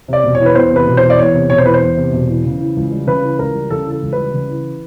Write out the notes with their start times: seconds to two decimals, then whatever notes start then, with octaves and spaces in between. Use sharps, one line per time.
0.08 C3 D5
0.24 E1
0.35 C#5
0.40 E3
0.46 B4
0.55 E2 C5
0.71 C3 B4
0.87 E1
0.97 C5
1.02 E3
1.10 D5
1.19 E2 C#5
1.34 C3
1.50 E1 C#5
1.58 C5
1.66 E3 B4
1.74 C5
1.82 E2
1.97 C3
2.13 E1
2.29 E3
2.45 C#3
2.60 E3
2.77 C#2
2.92 G3
3.07 C#3 B4
3.23 E3
3.39 C#2 A#4
3.54 G3
3.70 C#3 A4
3.86 E3
3.91 A4
4.02 C#2
4.13 G3 B4
4.34 C#3
4.49 E3